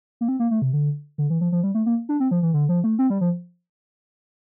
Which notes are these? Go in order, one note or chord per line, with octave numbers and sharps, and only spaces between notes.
A#3
C4
A#3
A3
C3
D3
D3
E3
F3
F3
G3
A3
A#3
D4
C4
F3
E3
D3
F3
A3
C4
G3
F3